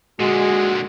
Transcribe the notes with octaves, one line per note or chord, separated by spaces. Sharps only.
A#2 D3 G#3 F#4